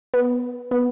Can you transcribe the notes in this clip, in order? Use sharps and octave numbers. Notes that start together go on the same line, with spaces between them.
B3
B3